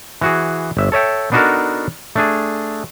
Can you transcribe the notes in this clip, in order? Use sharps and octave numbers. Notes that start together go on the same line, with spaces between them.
E3 F#4 G#4
G1 E5
A4 C#5 E5 G5
B3 D4 D#4 F#4 A4 A#4
A3 D4 G#4